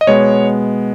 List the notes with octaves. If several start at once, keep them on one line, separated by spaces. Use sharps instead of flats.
D#5
B2 G#3 B3 C#5